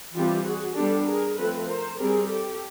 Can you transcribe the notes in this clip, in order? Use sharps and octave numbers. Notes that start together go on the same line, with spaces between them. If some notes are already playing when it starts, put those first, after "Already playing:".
E3 G3 C4 F4 G4
F#4 G#4
G3 B3 D4 G4 A4
G#4 A#4
F3 A3 C4 A4 B4
A#4 C5
G3 C4 G#4 A#4
G4 A4